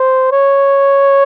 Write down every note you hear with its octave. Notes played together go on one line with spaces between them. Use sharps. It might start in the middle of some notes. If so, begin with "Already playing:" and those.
Already playing: C5
C#5